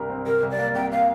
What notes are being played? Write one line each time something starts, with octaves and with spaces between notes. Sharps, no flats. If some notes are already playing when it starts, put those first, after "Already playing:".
Already playing: C2 G2 A#4
C4
C3 A#4
C2
D5
A#3
C2 G5
A#3 F5